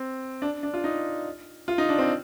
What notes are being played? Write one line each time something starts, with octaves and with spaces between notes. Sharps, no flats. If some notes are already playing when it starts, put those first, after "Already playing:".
Already playing: C4
D4
D4
F4
D#4
F4
D#4
D4
C4